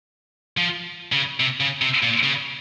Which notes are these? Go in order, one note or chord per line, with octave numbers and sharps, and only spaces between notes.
F3
C#3
C3
C#3
C3
A#2
C#3